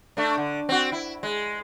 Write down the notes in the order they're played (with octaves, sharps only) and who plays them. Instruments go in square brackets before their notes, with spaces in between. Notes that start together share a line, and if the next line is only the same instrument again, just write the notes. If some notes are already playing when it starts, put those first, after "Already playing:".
[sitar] A3 D4
D3
C4 F#4
E4
G#3